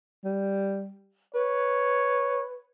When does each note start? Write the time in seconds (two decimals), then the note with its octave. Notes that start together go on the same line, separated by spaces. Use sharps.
0.25 G3
1.35 B4 C#5